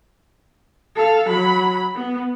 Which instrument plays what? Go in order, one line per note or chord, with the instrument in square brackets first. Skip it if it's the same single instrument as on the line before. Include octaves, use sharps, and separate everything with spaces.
[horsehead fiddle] A4 F5
F#3 B5
B3